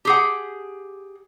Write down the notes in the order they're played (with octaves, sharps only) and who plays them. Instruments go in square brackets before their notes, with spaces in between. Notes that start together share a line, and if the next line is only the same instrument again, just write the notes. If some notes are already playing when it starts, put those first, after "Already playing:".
[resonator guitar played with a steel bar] G4 G#4 F#5